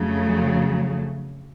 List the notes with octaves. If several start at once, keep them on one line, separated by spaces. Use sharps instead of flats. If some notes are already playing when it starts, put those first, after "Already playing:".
Already playing: F2 C#3 F#3 A3